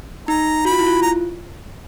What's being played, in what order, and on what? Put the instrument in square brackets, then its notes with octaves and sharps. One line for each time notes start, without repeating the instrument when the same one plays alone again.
[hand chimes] D#4 [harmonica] A#5
[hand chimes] F#4 [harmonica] B5
[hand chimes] F4
E4
F4
[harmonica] A#5